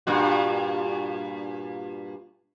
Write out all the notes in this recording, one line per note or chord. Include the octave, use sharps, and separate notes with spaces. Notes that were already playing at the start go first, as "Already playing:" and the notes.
G2 A#2 F#4